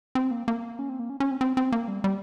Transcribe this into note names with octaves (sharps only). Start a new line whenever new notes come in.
C4
A#3
A#3
C#4
C4
A#3
C#4
C#4
C4
C4
C4
A#3
G3
G3